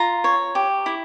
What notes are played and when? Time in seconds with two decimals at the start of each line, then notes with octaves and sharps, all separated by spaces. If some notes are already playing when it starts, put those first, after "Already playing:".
Already playing: F4 A#5
0.24 C#5
0.55 G4
0.86 E4